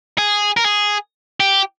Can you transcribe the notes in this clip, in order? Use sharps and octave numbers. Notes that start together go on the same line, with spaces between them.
G#4
A#4
G#4
G4